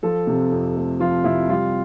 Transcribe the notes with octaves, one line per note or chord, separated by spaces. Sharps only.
F3 A4
C3
F2
A3
F3 F4
C3 E4
G3 F4